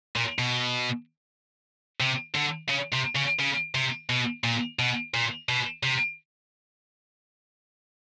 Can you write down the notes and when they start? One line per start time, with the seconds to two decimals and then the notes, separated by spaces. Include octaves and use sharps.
0.16 A#2
0.39 B2
2.00 C3
2.35 D3
2.70 C#3
2.93 C3
3.16 C#3
3.40 C#3
3.74 C3
4.10 B2
4.44 A#2
4.79 B2
5.14 A#2
5.49 B2
5.83 C3